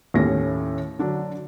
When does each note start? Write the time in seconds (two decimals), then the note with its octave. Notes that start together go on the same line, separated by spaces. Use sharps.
0.14 D#2 A2 A3 C#4 A#6
0.99 D3 F#3 D4